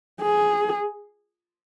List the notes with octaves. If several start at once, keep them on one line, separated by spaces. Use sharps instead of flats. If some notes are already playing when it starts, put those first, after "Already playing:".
G#4